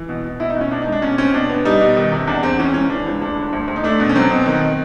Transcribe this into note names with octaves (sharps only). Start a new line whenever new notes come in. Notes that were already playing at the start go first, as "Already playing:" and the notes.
Already playing: E3
B2
B2
B2 E4
D#4
B2 C#4
B2 D4
D#4
G#3
D4
B2 C#4
C4 C#4
B2 D4
B3
G3 D#4
B2
D#3
C3
E2 D4
E2 C4
E3 C#4
C#2 C#4
E3 D4
C#2
D2 D4
D3
D2
D2
D#4
A3 D4
B2
C#4
F#3 C4
B2
D#3